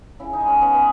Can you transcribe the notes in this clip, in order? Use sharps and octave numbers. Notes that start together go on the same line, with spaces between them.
C#3 E4
D#4
G#3
C#4
C#3 B3
B3